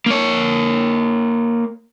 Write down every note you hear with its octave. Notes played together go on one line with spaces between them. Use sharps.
A#3 C#5